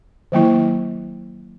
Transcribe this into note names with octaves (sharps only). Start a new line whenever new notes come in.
D#3 F#3 A#3 E4